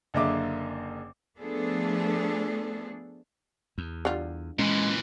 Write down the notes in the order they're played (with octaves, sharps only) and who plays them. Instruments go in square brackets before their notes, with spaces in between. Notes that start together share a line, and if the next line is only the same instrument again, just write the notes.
[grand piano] F#1 D3 A#3 D#5 E5 D6
[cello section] F3 A3 B3 D4 G#4 A4
[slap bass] E2
[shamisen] D3 G3 F4
[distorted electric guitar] A#2 E3 [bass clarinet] G#3 [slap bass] C#4